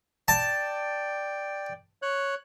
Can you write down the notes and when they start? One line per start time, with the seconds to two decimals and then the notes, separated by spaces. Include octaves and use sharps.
0.28 D5 G5 A5
2.02 C#5 F#6